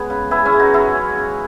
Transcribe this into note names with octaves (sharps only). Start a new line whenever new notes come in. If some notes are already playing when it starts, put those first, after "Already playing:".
Already playing: G#3 B3 C#4 G#4 B4
C#3
B3 E4 G#4
C#4 E4
G#3
D#4 F#4
F#3 E4 G#4
C#4
C#3